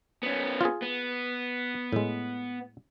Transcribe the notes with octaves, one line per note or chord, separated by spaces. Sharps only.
B3 C#4
F4 G#4
B3
A2 G#3